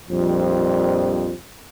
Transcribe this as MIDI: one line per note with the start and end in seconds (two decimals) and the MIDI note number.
0.10 1.32 34
0.10 1.32 41
0.10 1.32 53
0.10 1.32 55